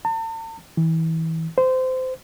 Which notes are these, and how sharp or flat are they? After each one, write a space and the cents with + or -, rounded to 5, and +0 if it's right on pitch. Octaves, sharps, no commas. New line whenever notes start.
A5 +45
E3 -30
C5 -20